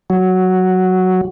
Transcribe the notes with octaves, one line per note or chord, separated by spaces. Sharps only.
F#3